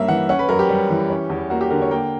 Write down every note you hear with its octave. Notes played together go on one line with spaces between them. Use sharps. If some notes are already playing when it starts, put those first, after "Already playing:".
Already playing: G2 A#3 C#4 E5
E3 F#5
C#4 F#5
B4
F#2 A#4
G4
G3
E3
C#4
E2
A#3 F#4
G4
D3 A#4
C#5
A#3 G5